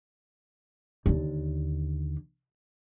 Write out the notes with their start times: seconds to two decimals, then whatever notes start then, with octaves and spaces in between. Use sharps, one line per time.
1.06 D#2 D3